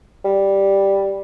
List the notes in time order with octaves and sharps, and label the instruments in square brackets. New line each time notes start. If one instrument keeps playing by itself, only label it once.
[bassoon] G3